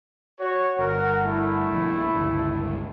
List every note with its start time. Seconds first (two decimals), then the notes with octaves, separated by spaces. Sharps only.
0.40 F#4 C#5
0.79 G1 A#4 F#5
1.25 A3 E4
1.71 B1 F3
2.15 G1 C#2